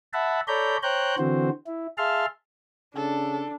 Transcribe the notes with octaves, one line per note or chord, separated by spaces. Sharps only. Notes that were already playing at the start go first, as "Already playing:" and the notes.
E5 F#5 A5 B5
A4 C#5 D5 A#5 B5 G6
C5 C#5 G5 A#5 F#6 G6
D3 E3 C4 F#4 C5
E4
G#4 E5 F5 A5 C6 F6
C#3 D4 A4